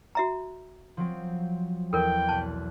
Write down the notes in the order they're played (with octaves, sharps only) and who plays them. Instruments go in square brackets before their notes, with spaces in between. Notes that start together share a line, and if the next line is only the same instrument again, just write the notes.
[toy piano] F#4 E5 A#5
[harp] F3 F#3 C4
[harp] E2 [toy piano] A4 A#4 [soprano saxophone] G5
[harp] B1 F#6 [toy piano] A5